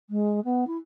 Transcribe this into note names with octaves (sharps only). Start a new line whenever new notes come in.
G#3
B3
E4